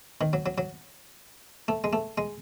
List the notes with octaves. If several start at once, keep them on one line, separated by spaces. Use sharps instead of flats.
D#3
F#3
F#3
F#3
A3
G#3
A3
G#3